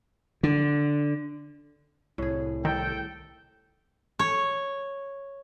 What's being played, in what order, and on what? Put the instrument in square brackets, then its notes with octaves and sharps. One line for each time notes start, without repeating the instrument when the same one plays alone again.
[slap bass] D3
[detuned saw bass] C2 [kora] A2 G#4
[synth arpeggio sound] D#3 [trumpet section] A4 G5
[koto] C#5